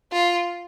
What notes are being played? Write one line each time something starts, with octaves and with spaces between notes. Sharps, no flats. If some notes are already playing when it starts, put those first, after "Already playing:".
F4